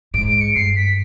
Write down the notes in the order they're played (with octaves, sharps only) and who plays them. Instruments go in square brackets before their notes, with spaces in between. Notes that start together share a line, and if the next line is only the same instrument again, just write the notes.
[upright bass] G#2 [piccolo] D7
[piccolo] D7
C#7
[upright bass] G2 [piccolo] C7
[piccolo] B6